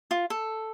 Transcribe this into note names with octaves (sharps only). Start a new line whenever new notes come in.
F4
A4